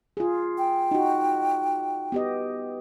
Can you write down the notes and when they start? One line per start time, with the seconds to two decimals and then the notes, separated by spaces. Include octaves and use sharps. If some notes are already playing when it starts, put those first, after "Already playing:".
0.17 F4 G#4
0.58 G5
0.91 D#4 F#4
2.12 B3 G4 D#5